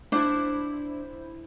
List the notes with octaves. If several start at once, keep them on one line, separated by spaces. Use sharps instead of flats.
D4 E4 C5